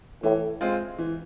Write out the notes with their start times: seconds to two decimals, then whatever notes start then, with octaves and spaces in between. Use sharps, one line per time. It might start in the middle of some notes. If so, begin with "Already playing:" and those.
0.23 A2 E3
0.61 G#3 C4 F4
0.98 E3